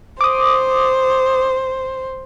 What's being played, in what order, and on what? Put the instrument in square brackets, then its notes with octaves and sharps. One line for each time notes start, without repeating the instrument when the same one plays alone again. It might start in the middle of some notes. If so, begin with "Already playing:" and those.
[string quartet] C5 [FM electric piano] D6 D#6